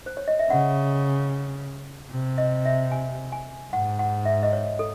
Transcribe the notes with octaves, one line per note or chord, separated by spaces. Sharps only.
C5
C#5
D#5
E5
C#3 F#5
C3
D#5
E5
G#5
G#5
G#2 F#5
F#5
E5
D#5
C#5
A4